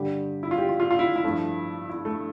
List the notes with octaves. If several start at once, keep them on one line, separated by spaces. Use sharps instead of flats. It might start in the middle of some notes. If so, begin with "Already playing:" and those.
Already playing: G2 D3 G3 G4
E4
F4
G4
F4
F4
F4
E4
E4
G2 F3 A3
E4
A3